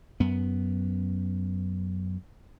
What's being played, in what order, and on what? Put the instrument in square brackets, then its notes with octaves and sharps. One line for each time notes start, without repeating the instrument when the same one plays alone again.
[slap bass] F#2 B3